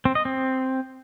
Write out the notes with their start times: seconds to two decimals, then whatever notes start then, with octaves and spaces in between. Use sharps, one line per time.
0.05 C4
0.15 D#5
0.25 C4